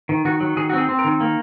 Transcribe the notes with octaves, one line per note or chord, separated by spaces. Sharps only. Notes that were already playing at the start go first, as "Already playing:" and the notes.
D#3
D#3 F#4
F#3
D#3 G#4
F#4
C4 G#4
C4
A#4
D#3
A#3